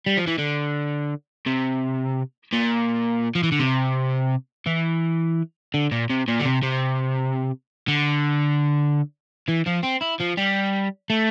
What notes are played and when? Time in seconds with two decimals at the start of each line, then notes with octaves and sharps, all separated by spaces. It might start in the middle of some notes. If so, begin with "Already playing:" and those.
0.06 G3
0.17 F3
0.27 E3
0.38 D3
1.46 C3
2.53 A#2
3.35 F3
3.43 E3
3.52 D3
3.60 C3
4.66 E3
5.74 D3
5.92 A#2
6.10 C3
6.28 A#2
6.40 D3
6.45 C3
6.63 C3
7.88 D3
9.49 E3
9.67 F3
9.84 C4
10.02 E4
10.21 F3
10.38 G3
11.10 A3